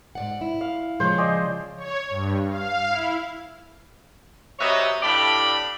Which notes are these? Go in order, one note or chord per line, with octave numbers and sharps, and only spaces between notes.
G#2 D5 F#5
E4
F5
C#3 F3 G#3 C5 C#5
D5 D#5 G#5
C#5
G2
F5
E4
C3 F#3 B4 C#5 D#5 E5
A2 D4 G4 D5 F5 B5